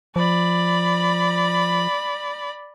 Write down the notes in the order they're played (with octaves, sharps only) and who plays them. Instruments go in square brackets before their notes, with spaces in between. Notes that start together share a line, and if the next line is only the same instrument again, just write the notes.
[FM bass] F3 [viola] D5 B5